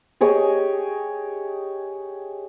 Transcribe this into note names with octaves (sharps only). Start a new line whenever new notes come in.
G4 G#4 C#5 D#5